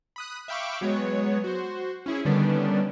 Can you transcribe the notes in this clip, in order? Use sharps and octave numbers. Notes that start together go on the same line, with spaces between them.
B5 D#6 F#6
E5 F5 G5 B5 C#6 D6
F#3 G#3 B3 C#5
F#4 C5
C#4 E4 G#4
D3 D#3 G3 B3 C#4 D4